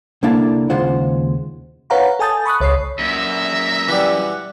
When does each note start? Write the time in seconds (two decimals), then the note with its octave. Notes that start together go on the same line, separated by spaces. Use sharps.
0.23 C2 D3 A#3 D4 E4 A5
0.70 D#2 C#3 G#3 F4 C5 F#5
1.90 B4 C#5 F5 F#5 A#5 B5
2.19 A4 G#5 A5 D#6 G6 A6
2.45 B5 C#6 D#6 F#6
2.60 C#2 C#5 B5 D#6 C7
2.99 F#2 A#2 E5 A#5
3.88 E3 G3 F#5